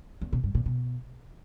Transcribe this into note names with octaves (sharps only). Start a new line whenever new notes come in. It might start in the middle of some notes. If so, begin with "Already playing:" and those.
E2
B2
G2
A#2
B2